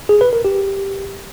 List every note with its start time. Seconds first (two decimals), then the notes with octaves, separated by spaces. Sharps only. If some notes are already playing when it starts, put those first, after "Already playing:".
0.09 G#4
0.21 B4
0.33 A#4
0.45 G4